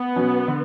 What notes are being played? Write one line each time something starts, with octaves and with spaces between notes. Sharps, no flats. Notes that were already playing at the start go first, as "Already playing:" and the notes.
Already playing: B3
B2 F#3 C#4
D3